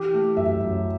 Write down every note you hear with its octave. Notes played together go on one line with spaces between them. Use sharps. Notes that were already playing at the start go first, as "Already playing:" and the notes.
Already playing: E3 G4
A3
F#2 E5
F#2